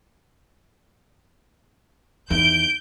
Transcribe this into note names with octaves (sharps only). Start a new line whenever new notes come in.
E2 D#3 G6 D7